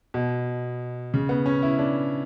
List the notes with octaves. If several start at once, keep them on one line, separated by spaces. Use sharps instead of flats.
B2
C#3
B3
C#4
E4
D4